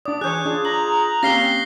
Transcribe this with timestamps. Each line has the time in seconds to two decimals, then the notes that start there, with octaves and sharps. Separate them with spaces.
0.05 D4 D5 D#6
0.21 E3 G#4 C#5 F#6 G6
0.45 D4 F4 G#4
0.65 A#5 F#7
1.23 A#3 C4 C#4 G4 F5 A#6 C7 G7